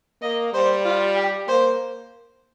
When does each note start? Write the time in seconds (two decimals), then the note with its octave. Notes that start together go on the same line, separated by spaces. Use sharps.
0.22 A#3 D#5
0.53 G3 C5
0.85 F4
1.16 G4
1.48 A#3 C5